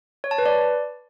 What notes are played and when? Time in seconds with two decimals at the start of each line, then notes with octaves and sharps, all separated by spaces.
0.24 C#5
0.31 A5
0.38 B4
0.46 D5